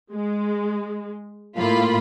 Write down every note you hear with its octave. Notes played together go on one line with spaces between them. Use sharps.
G#3
A2 A#3 F4 B5